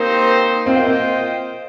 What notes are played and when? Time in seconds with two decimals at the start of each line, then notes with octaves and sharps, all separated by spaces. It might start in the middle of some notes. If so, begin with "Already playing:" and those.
Already playing: A#3 C4 D#4 G4 C5
0.66 C4 F4 C5 D#5 G5
0.76 A#3
0.86 A#3